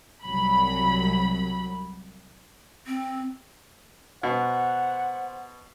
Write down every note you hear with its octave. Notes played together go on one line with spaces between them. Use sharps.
C2 F#3 B5
C4
B2 C5 F#5